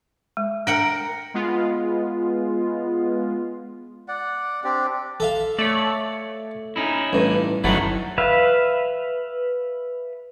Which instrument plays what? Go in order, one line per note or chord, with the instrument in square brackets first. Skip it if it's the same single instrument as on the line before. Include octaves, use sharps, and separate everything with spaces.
[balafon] G#3
[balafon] D4 [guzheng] A#4 F#5 G5
[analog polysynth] G#3 B3 F4
[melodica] D5 F#5
C4 D4 G4 D5
[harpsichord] A4 E5 F5
[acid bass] A3 [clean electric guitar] C#5 D5
[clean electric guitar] C#4 D#4 E4
[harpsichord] A1 G2
[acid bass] G1 [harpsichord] D#3 F#3 [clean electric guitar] E4 A4 B4
[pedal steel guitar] B4 E5 F5